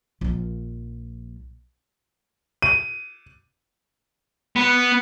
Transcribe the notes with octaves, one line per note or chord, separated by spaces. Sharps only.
A#1 F3
D#7
B3